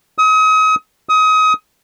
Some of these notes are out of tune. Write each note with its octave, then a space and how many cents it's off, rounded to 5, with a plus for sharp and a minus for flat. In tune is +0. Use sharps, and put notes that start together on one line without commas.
D#6 +35
D#6 +25